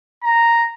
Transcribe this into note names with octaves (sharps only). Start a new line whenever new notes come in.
A#5